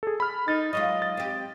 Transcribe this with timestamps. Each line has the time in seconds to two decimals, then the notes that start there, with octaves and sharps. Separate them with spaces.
0.03 G#4 A4
0.20 B5 F6
0.48 D#4 A6
0.73 F#3 G#3 F4 D#5
1.02 A6
1.17 C4 G4